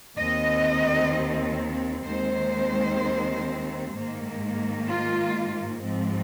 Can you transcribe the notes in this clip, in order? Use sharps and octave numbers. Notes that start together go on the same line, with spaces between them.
D#2 D#3 C4 D#5
D#2 D#3 G#3 C4 C5
G#2 D#3 A#3
F4
G#2 F3 C4